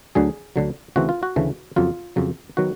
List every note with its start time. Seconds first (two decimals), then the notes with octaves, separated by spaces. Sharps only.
0.15 D2 D3 F#3 G#4
0.56 D2 D3 F#3
0.96 D2 C#3 E3 A3 C4 F#4
1.09 F4
1.23 F#4
1.36 D2 C#3 E3 A3 C4
1.76 F2 C#3 F#3 F4
2.16 F2 C#3 F#3
2.57 D#3 F#3 B3 F#4